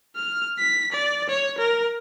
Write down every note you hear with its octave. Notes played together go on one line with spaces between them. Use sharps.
F6
B6
D5
C#5
A#4